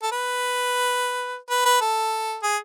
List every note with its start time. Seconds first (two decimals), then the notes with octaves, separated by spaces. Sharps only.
0.02 A4
0.12 B4
1.50 B4
1.65 B4
1.81 A4
2.43 G#4